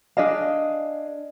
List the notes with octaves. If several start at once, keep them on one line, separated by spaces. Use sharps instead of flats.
D4 G#4 D#5 F5